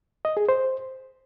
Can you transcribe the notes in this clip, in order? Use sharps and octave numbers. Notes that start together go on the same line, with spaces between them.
D#5
G#4
C5